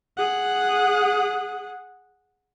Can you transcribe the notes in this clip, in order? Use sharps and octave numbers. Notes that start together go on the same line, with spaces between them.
G#4 F#5